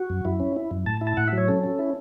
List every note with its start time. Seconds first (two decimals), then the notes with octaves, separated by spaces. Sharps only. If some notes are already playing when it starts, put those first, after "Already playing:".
Already playing: F#4
0.10 F#2
0.25 F#2 E4
0.40 C#4
0.56 E4
0.71 F#2
0.86 A2 A5
1.01 E4
1.07 A5
1.17 A2 F#5
1.28 F#3 E5
1.38 C#5
1.48 C#4 A4
1.63 C#4
1.79 E4